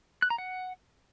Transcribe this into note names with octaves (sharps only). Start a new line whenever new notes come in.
F#6
A#5
F#5